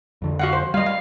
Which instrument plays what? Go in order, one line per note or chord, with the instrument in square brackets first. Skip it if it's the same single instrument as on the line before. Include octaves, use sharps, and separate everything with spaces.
[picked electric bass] F2 D3
[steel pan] F#4 F5 F#5
C5
[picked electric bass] G3 [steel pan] D#5 F5
[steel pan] F5